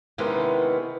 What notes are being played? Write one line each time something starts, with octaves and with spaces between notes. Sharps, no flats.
C3 D#3 E3 G#3 B3 C#4